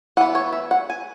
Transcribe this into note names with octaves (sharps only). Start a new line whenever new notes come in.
E3 B3 F#5
C#5
E5
F#5
G#5